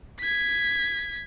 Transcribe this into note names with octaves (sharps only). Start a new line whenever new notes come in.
G#6 B6